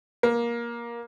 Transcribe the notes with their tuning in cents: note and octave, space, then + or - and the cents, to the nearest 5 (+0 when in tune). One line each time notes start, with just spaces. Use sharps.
A#3 +15